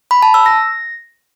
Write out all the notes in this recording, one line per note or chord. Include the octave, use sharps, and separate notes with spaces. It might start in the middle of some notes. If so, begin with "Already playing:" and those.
B5
A5
E6
A#6